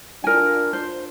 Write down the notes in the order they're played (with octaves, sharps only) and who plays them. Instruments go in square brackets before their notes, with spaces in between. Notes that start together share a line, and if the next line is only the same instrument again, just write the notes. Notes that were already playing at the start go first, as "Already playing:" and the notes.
[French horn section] D4 F4 [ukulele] A#4 G#5
[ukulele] C5